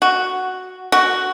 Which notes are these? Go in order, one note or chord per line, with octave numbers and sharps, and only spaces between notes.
F#4
F#4